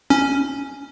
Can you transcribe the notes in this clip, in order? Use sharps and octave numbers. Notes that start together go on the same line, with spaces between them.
C#4